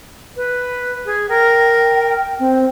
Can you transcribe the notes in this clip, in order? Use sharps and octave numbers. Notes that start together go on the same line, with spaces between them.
B4
G#4
A#4 G5
C4